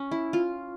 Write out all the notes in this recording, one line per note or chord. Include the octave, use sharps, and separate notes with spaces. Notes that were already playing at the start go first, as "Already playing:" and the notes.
Already playing: C#4
E4
F4